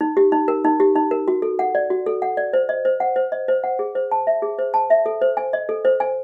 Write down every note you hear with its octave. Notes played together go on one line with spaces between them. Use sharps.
D#4
G4
D#4
A#4
D#4
G4
D#4
A#4
F#4
A4
F#5
D5
F#4
A4
F#5
D5
C5
D#5
C5
F#5
C5
D#5
C5
F#5
G#4
C5
A5
E5
G#4
C5
A5
E5
A4
C5
G#5
D#5
A4
C5
G#5